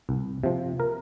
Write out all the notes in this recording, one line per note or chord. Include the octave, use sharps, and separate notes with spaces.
C2
C3 F3
A#4